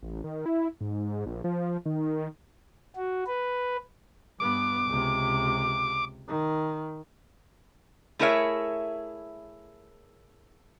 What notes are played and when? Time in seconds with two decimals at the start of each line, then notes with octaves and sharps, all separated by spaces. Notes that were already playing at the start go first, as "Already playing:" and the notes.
0.02 A1
0.24 D#3
0.46 E4
0.81 G#2
1.26 A#1
1.44 F3
1.86 D#3
2.96 F#4
3.27 B4
4.40 G2 B3 D6
4.87 C#2 C3
6.28 D#3
8.19 A3 E4 G#4 A#4 C#5 E5